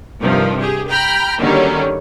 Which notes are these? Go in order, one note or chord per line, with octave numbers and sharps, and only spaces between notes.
G2 C3 D#3 F3
G4 G#4
G5 A#5 B5 F6
D3 D#3 F#3 G3 A#3 C#4